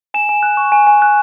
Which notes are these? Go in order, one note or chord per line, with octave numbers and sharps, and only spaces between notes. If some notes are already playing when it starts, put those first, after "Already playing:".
G#5 E7
G#5
F#6
C#6
G#5
G#5
F#6